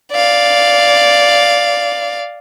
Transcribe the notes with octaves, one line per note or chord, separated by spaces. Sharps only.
D5 F5